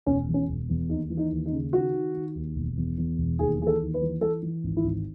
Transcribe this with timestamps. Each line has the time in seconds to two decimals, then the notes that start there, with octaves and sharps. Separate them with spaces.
0.06 E1 C#4
0.28 E2
0.34 C#4
0.48 E1
0.69 E2
0.89 D#2 D#4
1.10 E3
1.17 D#4
1.31 D#2
1.46 D#4
1.52 C#3
1.72 D#3 F#4
1.93 D#3
2.14 D#3
2.35 D#2
2.55 E1
2.77 E2
2.98 E2
3.18 E1
3.39 D#2 G#4
3.59 E3 G#4
3.67 A4
3.81 D#2
3.94 B4
4.02 E3
4.21 E3 A4
4.42 E3
4.64 G#1
4.77 E4
4.84 G#1